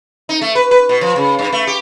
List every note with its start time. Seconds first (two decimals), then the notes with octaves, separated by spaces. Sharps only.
0.29 D#4
0.41 A3
0.55 B4
0.71 B4
0.89 B2
1.01 F3
1.16 C#3
1.39 G2
1.53 A3
1.67 G4